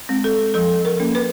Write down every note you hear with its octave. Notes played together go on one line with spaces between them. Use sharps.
G#3 C4
A4
F3 A4
A#4
A#3 C#4
B4